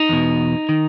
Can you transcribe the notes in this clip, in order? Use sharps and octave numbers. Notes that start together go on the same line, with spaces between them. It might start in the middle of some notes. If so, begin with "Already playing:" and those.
Already playing: D#4
E2 B2
D#3